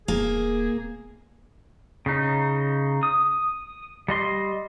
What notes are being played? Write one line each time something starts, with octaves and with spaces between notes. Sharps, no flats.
D#1 A#3 G#4
C#3 D#4
D#6
G3 D#5 C6